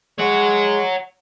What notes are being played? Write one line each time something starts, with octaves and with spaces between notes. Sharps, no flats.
G#3 C#5 F#5